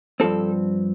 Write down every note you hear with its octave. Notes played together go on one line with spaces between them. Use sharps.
G2 F3 C4 A4